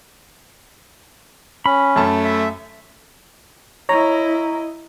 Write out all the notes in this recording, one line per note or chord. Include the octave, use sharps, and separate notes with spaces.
C#4 B5
F#2 A3 A5
E5
E4 C#5 D#5 A#5